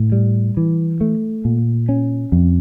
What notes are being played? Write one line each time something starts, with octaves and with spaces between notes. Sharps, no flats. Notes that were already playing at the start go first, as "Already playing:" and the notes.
Already playing: A2
G3
E3
A3
A#2
C#4
F2